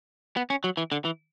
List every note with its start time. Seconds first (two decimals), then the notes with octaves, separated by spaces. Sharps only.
0.37 B3
0.50 C#4
0.64 F#3
0.77 E3
0.92 D3
1.05 E3